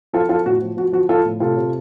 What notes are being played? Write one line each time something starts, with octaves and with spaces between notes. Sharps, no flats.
F3 F4 A4
F3 F4 A4
A2 F#4
F3
F3 F#4
F3 F#4
F3 F4 A4
A2
C3 F4 A4
C3